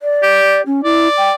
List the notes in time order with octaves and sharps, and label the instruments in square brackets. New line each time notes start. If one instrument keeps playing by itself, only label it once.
[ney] D5
[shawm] G4
[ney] C#4
[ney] E4 [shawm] D5
[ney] G5